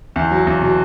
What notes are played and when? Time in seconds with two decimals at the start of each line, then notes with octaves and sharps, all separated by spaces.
0.16 E2
0.31 F#3
0.47 E2
0.62 B2